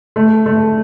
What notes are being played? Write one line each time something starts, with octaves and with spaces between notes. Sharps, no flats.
A3
A3